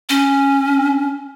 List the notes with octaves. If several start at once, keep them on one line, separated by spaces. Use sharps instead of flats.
C#4